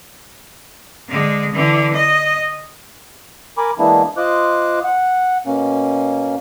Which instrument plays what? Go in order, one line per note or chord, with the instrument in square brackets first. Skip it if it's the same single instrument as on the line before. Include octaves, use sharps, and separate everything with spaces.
[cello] D3 G#3
D3 E3
D#5
[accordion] A#4 G#5 B5 D6
E3 G#3 A#3 B3 D4 E4
F4 C5 D#5 D6 F#6
F#5
B2 A#3 C#4